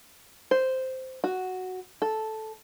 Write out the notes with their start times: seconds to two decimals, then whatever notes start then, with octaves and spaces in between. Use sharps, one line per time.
0.51 C5
1.24 F#4
2.02 A4